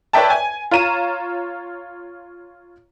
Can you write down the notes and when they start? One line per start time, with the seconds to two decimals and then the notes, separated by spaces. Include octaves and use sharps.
0.13 B4 C#5 D5 E5 G5 A5
0.30 G#5
0.71 F4 C#5 A#5 D#7 E7